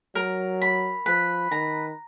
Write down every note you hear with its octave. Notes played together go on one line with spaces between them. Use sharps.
F#3 A#4
B5
F3 B4
D#3 A#5